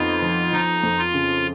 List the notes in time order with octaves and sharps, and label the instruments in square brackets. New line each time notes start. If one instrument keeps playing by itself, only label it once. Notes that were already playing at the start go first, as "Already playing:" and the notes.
Already playing: [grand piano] F2 B3 D#4 [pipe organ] F4
[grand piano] F3
[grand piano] F3 [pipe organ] D#4
[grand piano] F2
[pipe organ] F4
[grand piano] C#3